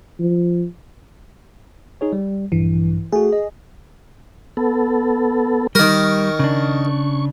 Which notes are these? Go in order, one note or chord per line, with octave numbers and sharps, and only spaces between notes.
F3
D#4 G#4 C#5
G3
A#1 G2 E3
A3 F#4 G#4
D#5
B3 A4
D#3 G3 A#4 C#6
C#3 D4